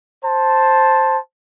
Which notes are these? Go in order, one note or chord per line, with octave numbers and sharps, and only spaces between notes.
C5 A5